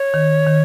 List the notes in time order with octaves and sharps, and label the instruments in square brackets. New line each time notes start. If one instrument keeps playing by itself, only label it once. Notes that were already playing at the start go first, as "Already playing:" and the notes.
Already playing: [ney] C#5
[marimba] D#3
D#3